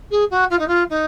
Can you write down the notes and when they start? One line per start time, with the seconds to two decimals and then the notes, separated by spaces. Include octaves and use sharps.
0.11 G#4
0.31 F#4
0.50 F4
0.59 D#4
0.68 F4
0.90 D#4